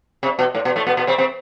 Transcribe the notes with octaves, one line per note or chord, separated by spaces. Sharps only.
C3
B2
A2
B2
A2 A3
B2 B3
B2 B3
C3 C4
C3 C4